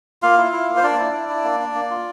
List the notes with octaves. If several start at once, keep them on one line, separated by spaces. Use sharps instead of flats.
A#3 F4 F5
E4
E4
A#3
C5
A#3 D4 D5
E4
E4
E4
A#3
D4
A#3
F4